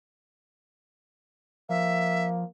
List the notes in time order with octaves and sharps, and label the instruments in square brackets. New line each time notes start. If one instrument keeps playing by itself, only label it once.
[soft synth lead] F3 [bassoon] A#3 [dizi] E5